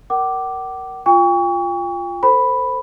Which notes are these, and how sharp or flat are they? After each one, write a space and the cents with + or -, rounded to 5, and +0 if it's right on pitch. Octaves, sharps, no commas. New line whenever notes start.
A#4 +0 F#5 +45 D6 +0
F4 +0 G5 +40 C#6 +30
A4 +25 C5 -5 B5 +0